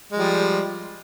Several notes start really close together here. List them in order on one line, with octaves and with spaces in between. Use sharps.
G#3 F3 G3